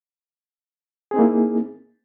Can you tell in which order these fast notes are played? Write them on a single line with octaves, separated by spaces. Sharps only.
G#4 C4 D#4 A#3 E4